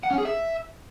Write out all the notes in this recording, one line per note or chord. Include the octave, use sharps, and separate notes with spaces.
F#5
C#4
G#4
E5